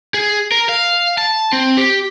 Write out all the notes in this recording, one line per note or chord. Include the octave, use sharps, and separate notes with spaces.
G#4
A#4
F5
A5
C4
G4